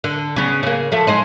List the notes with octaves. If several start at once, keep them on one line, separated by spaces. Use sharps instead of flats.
D3
C#3 B3
C#3 A#3
F3 A3
G#3 D#4 C5